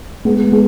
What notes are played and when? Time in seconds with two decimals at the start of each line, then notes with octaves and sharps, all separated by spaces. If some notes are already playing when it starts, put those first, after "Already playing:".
0.25 G#3 B3
0.52 G#3 B3